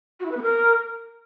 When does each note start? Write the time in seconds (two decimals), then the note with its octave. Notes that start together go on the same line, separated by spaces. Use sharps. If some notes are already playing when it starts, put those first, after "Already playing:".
0.20 F#4
0.26 E4
0.31 B4
0.37 B3
0.42 A#4